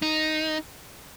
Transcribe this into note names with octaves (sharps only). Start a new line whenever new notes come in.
D#4